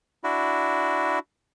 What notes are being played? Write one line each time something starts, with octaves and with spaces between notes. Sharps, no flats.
D4 E4 F#4